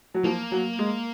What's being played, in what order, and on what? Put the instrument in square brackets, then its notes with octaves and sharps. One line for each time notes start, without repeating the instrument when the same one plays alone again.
[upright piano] F#3
[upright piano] F3 [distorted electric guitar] A#3
[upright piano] F#3
G#3